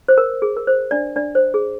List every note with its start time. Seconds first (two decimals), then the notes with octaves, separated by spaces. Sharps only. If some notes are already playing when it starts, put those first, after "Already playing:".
0.08 C5
0.18 A#4
0.42 G#4
0.57 A#4
0.67 C5
0.91 D4 D5
1.16 D4 D5
1.35 C5
1.54 G#4